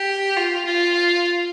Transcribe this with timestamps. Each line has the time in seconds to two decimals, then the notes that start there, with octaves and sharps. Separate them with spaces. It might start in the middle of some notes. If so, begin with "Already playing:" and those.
Already playing: G4
0.37 F4
0.66 F4